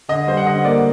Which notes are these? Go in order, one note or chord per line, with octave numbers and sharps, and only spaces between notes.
D3 D#5
G3 C5
F#5
D3 D#5
A#3 D5